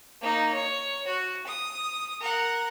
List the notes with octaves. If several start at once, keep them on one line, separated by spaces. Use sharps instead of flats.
A#3 D#4
C#5
F#4
D#6
A#4 F#5